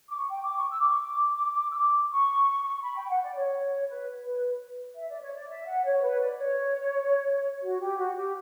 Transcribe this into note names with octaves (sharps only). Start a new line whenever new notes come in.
D6
C#6
G5
D6
C#6
E6
D6
C#6
D6
E6
D6
C#6
C#6
B5
G5
F#5
D5
C#5
B4
B4
E5
D5
C#5
D5
E5
F#5
C#5
B4
D5
C#5
F#4
G4
F#4
G4